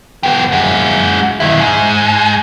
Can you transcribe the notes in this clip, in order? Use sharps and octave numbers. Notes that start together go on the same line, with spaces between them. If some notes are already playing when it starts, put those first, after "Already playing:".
B3 G4
G#3 F#4
D#3 E4
G#2